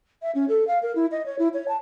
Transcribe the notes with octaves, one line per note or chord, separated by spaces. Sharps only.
E5
C#4
A4
F5
A#4
E4
D#5
C#5
E4
C#5
A5